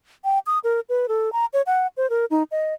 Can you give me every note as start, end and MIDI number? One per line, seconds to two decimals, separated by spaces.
0.24 0.39 79
0.47 0.59 87
0.64 0.80 70
0.89 1.06 71
1.08 1.32 69
1.33 1.45 82
1.53 1.62 73
1.66 1.87 78
1.97 2.09 72
2.10 2.25 70
2.31 2.43 63
2.51 2.74 75